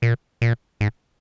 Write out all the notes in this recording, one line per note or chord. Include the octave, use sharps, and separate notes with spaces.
A#2
A#2
G#2